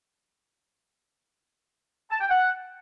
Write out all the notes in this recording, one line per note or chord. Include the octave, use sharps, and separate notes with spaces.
A5
G5
F#5